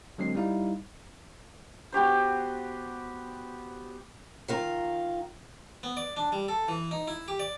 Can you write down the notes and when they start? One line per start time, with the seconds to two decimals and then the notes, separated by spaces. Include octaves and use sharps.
0.18 D3 F#3 G#3 C4 C7
0.35 G3 D#4 E4 F5
1.92 B3 F#4 G4 C5
4.48 D#3 F4 A#4
5.83 B3
5.97 D5
6.17 D4
6.32 G3
6.48 A4
6.68 E3
6.91 D#4
7.08 E4
7.28 G4
7.39 D5